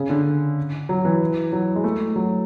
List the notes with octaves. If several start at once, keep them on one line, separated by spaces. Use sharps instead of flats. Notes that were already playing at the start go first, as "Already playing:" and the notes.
Already playing: C#3
D3
F#3
E3
F#3
G#3
A3
F#3